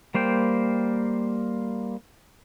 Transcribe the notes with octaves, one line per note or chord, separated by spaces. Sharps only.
G3 A#3 C5 G5